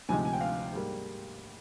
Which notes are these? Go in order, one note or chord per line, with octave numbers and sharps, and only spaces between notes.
D2 C3 F3 G#3 D#4 G#5
G#5
G5
F5
G#2 G3 A#3